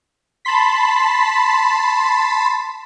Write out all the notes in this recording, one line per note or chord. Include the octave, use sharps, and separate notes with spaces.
A5 B5 C6 B6